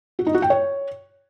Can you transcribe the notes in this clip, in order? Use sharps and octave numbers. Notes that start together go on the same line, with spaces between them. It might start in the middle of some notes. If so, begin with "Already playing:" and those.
F#4
D#4
F#4
G5
C#5